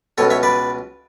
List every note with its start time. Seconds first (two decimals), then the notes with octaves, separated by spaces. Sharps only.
0.18 C#2 B2 A4 C#5
0.30 C#5 E5
0.43 B4 D5